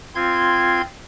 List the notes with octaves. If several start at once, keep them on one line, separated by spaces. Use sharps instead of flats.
C4 F4 C6 G#6